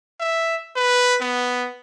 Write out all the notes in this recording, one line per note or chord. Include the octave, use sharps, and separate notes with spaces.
E5
B4
B3